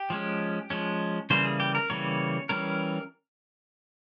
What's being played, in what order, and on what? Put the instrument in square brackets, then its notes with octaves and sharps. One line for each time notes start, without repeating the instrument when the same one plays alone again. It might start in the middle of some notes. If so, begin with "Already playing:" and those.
Already playing: [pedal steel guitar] G4
F3 G#3 C#4
F3 G#3 C#4
C#3 E3 G3 A#3 C5
G#4
G4
A#4
C#3 E3 G3 A#3 C#5
E3 G3 C#4 A#4